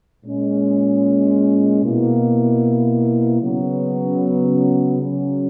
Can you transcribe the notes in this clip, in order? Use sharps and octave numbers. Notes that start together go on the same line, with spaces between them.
A#2 G#3 C#4
B2 A#3 E4
C#3 F#3 B3
C#3 F#3 C#4